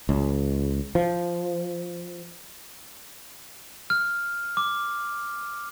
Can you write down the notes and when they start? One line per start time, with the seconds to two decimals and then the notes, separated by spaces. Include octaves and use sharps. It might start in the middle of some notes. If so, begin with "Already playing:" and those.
0.09 C#2
0.95 F3
3.90 F6
4.57 D6